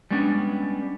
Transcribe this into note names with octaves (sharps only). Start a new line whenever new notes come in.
G3 G#3 B3 C#4 D4